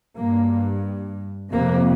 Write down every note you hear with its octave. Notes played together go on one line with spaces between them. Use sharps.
G2 A#3
F2 C3 A#3